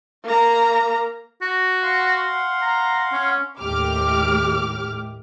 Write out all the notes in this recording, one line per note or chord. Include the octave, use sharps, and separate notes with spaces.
A#3 A#5
F#4
F5 F#5 C6
A#5
C#4
D#2 A2 G4 D6 F6